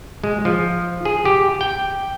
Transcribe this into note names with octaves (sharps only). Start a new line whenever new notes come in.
G#3
F3
G#4
G4
G5